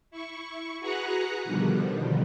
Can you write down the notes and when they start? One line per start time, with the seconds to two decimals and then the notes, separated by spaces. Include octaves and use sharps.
0.11 E4 C#6
0.79 F#4 G#4 B4 F#5 A#5 F#6
1.44 B2 D3 D#3 F3 G3